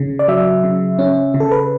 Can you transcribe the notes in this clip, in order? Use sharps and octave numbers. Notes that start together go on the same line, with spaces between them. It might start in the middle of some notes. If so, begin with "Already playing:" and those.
Already playing: C#3
D5
F#3 E5
C#3
C#4
C#3
A4
B4